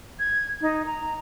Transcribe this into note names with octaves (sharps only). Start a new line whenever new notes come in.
G#6
D#4
A#5